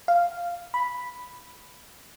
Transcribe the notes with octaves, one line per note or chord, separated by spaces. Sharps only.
F5
B5